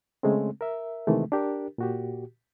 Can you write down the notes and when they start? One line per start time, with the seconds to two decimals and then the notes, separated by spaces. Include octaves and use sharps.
0.23 C#3 G#3 A3 C4
0.61 A#4 E5
1.07 C3 D#3 E3 G#3 A3
1.32 D4 G4 A#4
1.78 A#2 F#4 G4